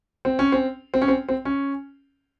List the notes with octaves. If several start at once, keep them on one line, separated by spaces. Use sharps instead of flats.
C4
C#4
C4
C4
C#4
C4
C4
C#4